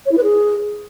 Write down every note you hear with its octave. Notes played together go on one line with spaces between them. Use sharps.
C#5
E4
B4
G#4